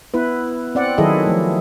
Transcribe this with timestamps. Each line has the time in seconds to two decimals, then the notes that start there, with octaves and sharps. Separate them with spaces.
0.14 B3 E4 B4
0.75 C4 D5 F#5
0.98 D#3 F#3 E4 G#4 A4 D#5
1.26 F3 A3